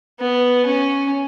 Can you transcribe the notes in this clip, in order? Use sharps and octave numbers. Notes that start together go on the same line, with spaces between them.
B3
C#4